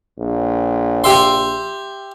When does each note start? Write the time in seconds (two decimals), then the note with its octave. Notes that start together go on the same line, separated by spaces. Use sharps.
0.18 A#1
1.04 G4 E5 C6